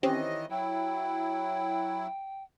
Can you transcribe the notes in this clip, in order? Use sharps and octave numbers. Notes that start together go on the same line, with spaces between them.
D#3 E3 C4 C#4 G4 D#5
F#3 E4 G5